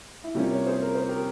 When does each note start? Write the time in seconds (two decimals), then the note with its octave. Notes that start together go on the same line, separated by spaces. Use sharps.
0.24 E4
0.35 C3 G3 A#3 C#4 F4
0.51 A#4 C#5
0.66 G#4 C5
0.82 A#4
0.95 C5
1.08 G4 A#4